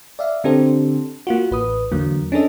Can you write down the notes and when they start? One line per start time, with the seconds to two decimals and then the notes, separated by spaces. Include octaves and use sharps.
0.19 D5 E5 F5
0.44 D3 C4 D4 G4 A4 C5
1.27 A#3 F4 F#4
1.51 A1 B4 D#6
1.91 E2 D3 F#3 A#3
2.32 C#4 D4 G#4 A4 D#5